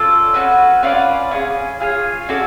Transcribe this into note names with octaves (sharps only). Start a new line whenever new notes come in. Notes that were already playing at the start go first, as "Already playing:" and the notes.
Already playing: C#4 F4 A4 D5
C#4 F#4 B4
C#4 F4 B4 D5
C#4 F4 G#4
F4 G#4 C#5
C#4 F#4 A4 D5